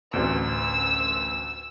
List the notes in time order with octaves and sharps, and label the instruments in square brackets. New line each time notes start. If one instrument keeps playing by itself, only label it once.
[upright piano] A1 D2 [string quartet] E6